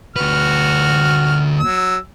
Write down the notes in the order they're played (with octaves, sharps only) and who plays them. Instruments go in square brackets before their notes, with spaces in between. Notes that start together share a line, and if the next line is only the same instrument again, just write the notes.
[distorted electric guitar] D2 B4 [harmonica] F#4 F6
[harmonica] F#3 E6